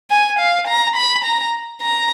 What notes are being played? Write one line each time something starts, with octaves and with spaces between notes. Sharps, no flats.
G#5
F5
A#5
B5
A#5
A#5